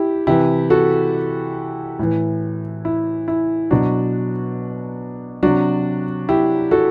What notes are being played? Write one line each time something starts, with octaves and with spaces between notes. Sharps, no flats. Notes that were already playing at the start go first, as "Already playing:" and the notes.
Already playing: E4 G4
C3 E3 E4 G4
F#4 A4
A2 E3
E4
E4
B2 F#3 D4 F#4
C3 F#3 D4 F#4
E4 G4
F#4 A4